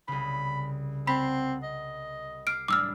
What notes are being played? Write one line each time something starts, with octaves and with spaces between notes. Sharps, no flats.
C2 C#3 B5
C4 F#5 A5 B5 B6 C7
D#5
D6 F6 C7 D7
A1 G3 D4 D6 E6 F6